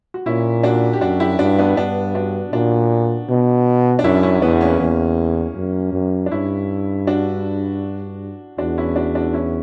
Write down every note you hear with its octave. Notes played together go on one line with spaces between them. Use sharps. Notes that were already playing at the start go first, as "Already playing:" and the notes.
F#4
A#2 C#4 E4
D4 F#4
G4
F#2 D4 F#4
E4 G4
G2 D4 F#4
B3 D4
G2 B3 D4
D4 F#4
A#2 D4 F#4
B2
D4
F#2 C#4 E4
C#4 E4
E2 B3 D4
A#3 C#4
E2
F#2
F#2
D4
G2 C#4 E4
D4 F#4
E2 D4 F#4
C#4 E4
D4 F#4
D4 F#4
C#4 E4